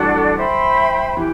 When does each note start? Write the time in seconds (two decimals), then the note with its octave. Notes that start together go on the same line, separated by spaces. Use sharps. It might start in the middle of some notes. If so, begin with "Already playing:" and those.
Already playing: E3 F#3 G3 A3 D4 F#4 A4 D5
0.37 C5 E5 G5 B5
1.17 E3 G4